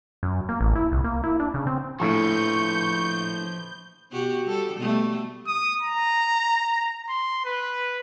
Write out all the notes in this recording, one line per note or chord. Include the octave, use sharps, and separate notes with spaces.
F#2
A#3
A1
E4
C2
A#3
E4
D4
C#3
C4
A#1 A2 F3 B4 C#6 G6
B2 F#4 G4
G3 A4
B2 G3 A3
D#6
A#5
C6
B4